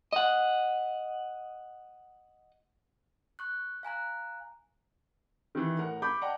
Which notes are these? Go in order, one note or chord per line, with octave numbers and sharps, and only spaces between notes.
D#5 F#5
C#6 F#6
F5 G#5 A#5 F#6
D#3 E3
A2 A#4 F#5
B5 C#6 D6 G6
D5 D#5 F#5 G5 A5 A#5